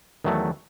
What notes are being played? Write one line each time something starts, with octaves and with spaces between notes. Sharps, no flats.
E2 D#3 F#3 A3